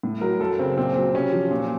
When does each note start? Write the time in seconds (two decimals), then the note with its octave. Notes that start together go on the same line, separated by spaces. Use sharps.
0.03 A2
0.21 F#3 A#4
0.40 F#2 A4
0.59 C#3 C4
0.77 A#2 C4
0.96 F#3
1.14 C3 C#4
1.33 F3
1.51 A#2